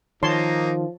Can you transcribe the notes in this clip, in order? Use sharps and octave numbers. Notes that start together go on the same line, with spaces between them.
D#3 F3 A#3 D#4 C#5 A5 C6